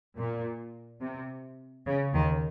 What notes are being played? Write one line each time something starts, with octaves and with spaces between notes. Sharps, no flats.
A#2
C3
C#3
D#2 D#3